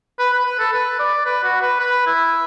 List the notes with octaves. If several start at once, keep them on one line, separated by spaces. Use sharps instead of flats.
B4
B4
B4
A4
B4
D5
B4
F#4
B4
B4
E4